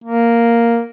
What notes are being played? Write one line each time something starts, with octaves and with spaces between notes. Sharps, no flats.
A#3